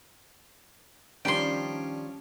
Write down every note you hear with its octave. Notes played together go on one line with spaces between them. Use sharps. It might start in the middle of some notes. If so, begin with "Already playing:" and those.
D#3 F3 G3 C#4 D4 C5 G5 C6